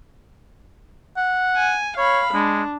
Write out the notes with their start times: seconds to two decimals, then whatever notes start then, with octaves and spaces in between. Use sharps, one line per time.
1.17 F#5
1.56 G#5
1.97 C#5 F5 B5
2.34 G#3 D4